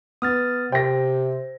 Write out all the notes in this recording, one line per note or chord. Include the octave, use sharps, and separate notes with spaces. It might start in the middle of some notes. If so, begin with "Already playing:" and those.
B3 D#6 F6 A6
C3 C5 G5 A#6